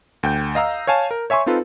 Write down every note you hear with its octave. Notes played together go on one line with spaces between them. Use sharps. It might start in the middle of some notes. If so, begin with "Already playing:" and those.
D2 G5 G6
D#5 F5 A#5 E6
C#5 F5 G#5 A5
A#4
C#5 E5 G#5 C6 C#6
C4 D#4 F4 A4 B4